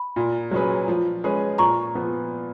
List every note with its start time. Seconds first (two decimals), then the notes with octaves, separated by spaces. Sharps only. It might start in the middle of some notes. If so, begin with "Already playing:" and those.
Already playing: B5
0.16 A#2
0.51 F#3 C#4 G#4 B4
0.88 F3
1.24 G#3 C#4 G#4 B4
1.58 A#2 A#5 C#6
1.95 F3 B3